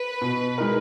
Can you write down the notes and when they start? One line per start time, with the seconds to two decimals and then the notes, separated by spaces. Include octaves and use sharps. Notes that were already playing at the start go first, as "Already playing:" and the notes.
Already playing: B4
0.21 B2
0.58 G#3 D#4 A#4